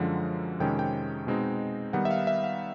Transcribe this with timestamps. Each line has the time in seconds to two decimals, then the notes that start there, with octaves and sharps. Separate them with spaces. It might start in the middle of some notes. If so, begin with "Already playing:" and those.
Already playing: F#2 D3 F3 G#3 F#5
0.60 F2 C3 D#3 G#3 C#4 G5
0.79 G5
1.27 B2 G#3 C4 D#4
1.93 D#3 G3 B3 D#4 F#5
2.05 E5
2.11 F5
2.27 E5
2.44 F5